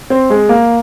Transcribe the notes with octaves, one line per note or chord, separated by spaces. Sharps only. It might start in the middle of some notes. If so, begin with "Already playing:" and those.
C4
G#3
A#3